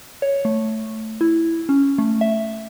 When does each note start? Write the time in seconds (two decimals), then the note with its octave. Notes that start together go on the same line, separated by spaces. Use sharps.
0.22 C#5
0.45 A3
1.21 E4
1.69 C#4
1.98 A3
2.21 E5